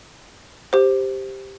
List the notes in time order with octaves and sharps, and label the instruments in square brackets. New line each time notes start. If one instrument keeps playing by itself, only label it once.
[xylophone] G4 C5